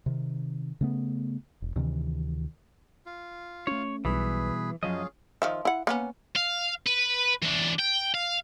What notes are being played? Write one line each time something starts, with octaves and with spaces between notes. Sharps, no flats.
C3 D#3
C#3 A3 B3
E1
D2 C3 D#3 E3
F4
A3 C#4 C#5
B1 B2 E3 G3 B3 G#4 B4
F#2 F3 F#3 C#4 F4 G#4 D#5
D#3 F3 E5
E4 F#5
A#3 B3 C#4
F5
B4
E3 D4
G5
F5